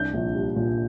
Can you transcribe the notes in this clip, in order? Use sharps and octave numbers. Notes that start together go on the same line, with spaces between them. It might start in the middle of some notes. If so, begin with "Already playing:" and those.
Already playing: C2 D4 G6
A#1
G3
A#2